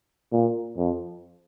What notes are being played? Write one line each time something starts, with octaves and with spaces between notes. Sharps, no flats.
A#2
F2